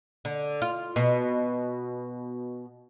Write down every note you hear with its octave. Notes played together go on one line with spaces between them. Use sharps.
D3
F4
B2